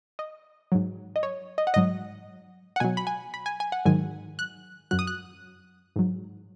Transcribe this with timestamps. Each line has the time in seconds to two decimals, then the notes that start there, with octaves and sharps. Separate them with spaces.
0.19 D#5
0.72 G#2 F#3
1.16 D#5
1.23 C#5
1.58 D#5
1.67 F#5
1.74 G#2 F#3 D#5
2.76 F#5
2.80 B2 F#3 G#5
2.97 B5
3.07 G#5
3.34 B5
3.46 G#5
3.60 G#5
3.72 F#5
3.85 G#2 D#3 F#3 G#5
4.39 F#6
4.91 F#2 F#3 F#6
4.99 D#6
5.07 F#6
5.96 G#2 F#3